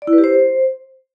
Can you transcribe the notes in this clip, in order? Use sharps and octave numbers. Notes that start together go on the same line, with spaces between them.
D5
E4
B4
G4
C5